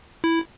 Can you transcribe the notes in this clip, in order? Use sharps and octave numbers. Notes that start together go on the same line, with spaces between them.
E4